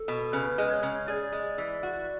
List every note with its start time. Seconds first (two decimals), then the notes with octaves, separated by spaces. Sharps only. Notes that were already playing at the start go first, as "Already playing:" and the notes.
Already playing: A4
0.08 B2
0.33 C#3 B4
0.58 G#3
0.70 C#5
0.83 C#3
1.08 G#4 D5
1.33 G#3
1.58 E3
1.83 F#4